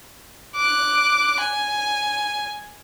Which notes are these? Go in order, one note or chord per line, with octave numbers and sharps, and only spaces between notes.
D6 F#6
G#5